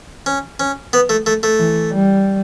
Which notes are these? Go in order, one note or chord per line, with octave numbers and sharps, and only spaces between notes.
C#4
C#4
B3
A3
A3
A3
E3
G3